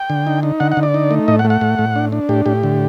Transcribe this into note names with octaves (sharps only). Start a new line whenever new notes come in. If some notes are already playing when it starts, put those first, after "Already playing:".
Already playing: G5
D3
D#4
D#4
D3 F#5
F#5
D3
D5
D#4
A3
A2 D#5
F#5
A3
F#5
A2
A2
D4
D4
A2 G4
A2 G4
D3